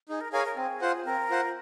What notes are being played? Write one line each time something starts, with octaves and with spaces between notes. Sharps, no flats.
D#4 G#4
A#4
G#4 A#4 C#5 F5 G#5
A#4
C4 G#4
F4 C5 F#5
C4 A#4
F4 C5 F#5